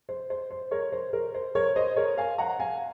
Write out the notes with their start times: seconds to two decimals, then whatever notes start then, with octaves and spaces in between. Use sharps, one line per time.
0.09 C5
0.30 C5
0.51 C5
0.71 A#4 C#5
0.92 C5
1.13 A#4
1.34 C5
1.55 A#4 C#5
1.76 C5 D#5
1.96 A#4 C#5
2.17 F5 G#5
2.38 F#5 A#5
2.60 F5 G#5